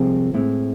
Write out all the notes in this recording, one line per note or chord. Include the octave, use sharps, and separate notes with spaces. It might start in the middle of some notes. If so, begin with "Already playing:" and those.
Already playing: C2 C3 F3 G#3 C4
A2 G#3 C4 E4